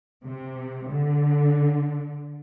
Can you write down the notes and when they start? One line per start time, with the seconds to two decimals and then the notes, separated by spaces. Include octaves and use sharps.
0.25 C3
0.89 D3